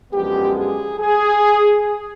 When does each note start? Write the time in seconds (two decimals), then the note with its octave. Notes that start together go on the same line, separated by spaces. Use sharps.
0.12 F#2 D3 F3 G#3 B3 G4
0.55 G#4
1.00 G#4